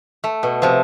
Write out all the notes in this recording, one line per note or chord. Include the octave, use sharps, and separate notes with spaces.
A3
B2
C3 F3